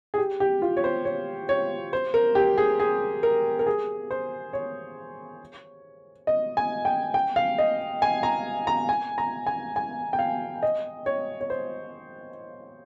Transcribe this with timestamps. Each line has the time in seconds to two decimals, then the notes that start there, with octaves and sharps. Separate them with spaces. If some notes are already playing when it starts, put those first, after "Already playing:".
0.14 G#4
0.18 G4
0.40 G4
0.62 F4
0.77 C#5
0.84 C5
1.05 C#5
1.49 C#5
1.93 C5
2.14 A#4
2.35 G4
2.58 G#4
2.80 G#4
3.23 A#4
3.59 A#4
3.67 G#4
4.11 C5
4.53 C#5
6.27 D#5
6.57 G#5
6.85 G5
7.14 G5
7.36 F5
7.58 D#5
8.02 G#5
8.23 A#5
8.67 A#5
8.89 G#5
9.18 A#5
9.47 G#5
9.76 G#5
10.13 G5
10.19 F5
10.63 D#5
11.06 C#5
11.41 C#5
11.50 C5